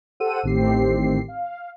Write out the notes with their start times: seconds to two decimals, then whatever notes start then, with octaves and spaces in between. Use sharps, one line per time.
0.20 G4 A4 C5 F#5 E6 D#7
0.43 A1 A2 D#3 C4 G4 C7
1.28 F5